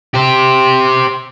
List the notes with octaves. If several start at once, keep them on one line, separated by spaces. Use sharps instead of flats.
G4 C5